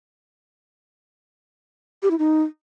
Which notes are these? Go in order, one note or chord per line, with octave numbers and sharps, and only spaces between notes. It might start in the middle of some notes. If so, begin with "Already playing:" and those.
G4
E4
D#4